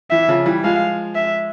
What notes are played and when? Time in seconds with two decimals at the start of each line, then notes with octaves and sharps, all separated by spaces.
0.11 E3 E5
0.28 C#3 F3
0.46 E3 G3
0.64 F3 G#3 F5
1.15 E5